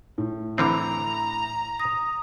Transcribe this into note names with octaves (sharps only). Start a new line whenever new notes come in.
A2
D3 E3 C4 E5 A#5 B5
D#6 A#6